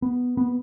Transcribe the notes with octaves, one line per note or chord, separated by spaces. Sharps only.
B3
B3